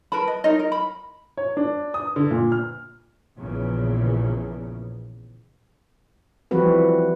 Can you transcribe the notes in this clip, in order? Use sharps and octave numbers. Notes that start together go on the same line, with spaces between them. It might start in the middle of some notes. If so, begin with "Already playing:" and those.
A#4 B4 A5 B5
D#5
D#4 A#4 C#5 D#5
A#4
B5
C#5
D4
D#6
D3
A#2
F6
A#1 E2 C#3
E3 F3 G3 C4 F#4 B4